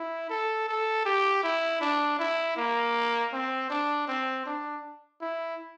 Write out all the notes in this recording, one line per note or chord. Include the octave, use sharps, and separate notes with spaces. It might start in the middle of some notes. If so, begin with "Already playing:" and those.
Already playing: E4
A4
A4
G4
E4
D4
E4
A#3
C4
D4
C4
D4
E4